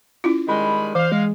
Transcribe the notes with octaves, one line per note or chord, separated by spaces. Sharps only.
C#4 E4 F4
D#3 G3 G#3 B5
E3 C5 F5
G#3